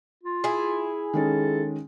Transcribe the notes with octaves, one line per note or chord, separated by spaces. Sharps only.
F4
E4 G#4
D#3 G#3 C#4 A4